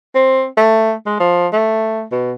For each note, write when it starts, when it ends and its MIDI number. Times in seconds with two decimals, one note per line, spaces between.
0.15 0.46 60
0.57 0.92 57
1.06 1.18 56
1.20 1.47 53
1.53 2.04 57
2.12 2.32 47